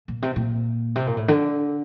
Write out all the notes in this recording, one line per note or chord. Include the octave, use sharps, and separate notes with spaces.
A#2
C3
A#2
C3
A#2
A2
D3